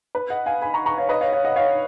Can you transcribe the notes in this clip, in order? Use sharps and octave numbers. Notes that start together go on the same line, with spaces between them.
B4
D#5 F#5
F5 G#5
G#5 B5
A#5 C#6
A#5 C#6
C#5 F5
B4 D#5
C#5 F5
C#5 F5
D#5 F#5
C#5 F5